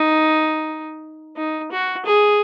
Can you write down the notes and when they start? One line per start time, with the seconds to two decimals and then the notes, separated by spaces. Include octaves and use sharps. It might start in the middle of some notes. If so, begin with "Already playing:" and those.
Already playing: D#4
1.36 D#4
1.71 F#4
2.05 G#4